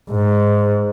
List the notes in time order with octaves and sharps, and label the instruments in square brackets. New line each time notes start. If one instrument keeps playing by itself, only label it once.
[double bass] G#2